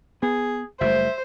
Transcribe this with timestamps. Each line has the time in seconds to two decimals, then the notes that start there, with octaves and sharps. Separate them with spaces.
0.23 B3 G#4
0.81 F#1 G3 A3 C5 E5